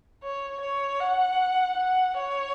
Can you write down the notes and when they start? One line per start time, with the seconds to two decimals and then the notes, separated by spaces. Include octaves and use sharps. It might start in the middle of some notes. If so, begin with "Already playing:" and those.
0.23 C#5
0.61 C#5
1.01 F#5
1.77 F#5
2.17 C#5